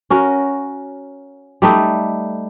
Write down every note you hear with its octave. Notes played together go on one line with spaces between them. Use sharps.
C#4 F#4 A#4
G3 A3 D#4